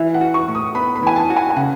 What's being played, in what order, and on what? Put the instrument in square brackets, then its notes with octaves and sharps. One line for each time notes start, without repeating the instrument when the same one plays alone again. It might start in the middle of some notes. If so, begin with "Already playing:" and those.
Already playing: [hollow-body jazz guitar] E3 [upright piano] E5
[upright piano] F#5
[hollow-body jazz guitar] F#4
[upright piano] C#6
[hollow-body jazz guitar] A2
[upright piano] D#6
[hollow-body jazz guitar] B3 [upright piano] B5
[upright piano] B5
[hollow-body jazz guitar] E3 [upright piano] G#5
[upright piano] A5
[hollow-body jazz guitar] F#4
[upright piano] G#5
G#5
[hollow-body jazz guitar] C#3 [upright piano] F#5